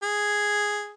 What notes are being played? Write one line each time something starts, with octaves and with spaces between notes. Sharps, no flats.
G#4